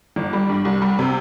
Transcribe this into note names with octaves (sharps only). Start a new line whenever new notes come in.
G1
G3
G2
C2
G3
C3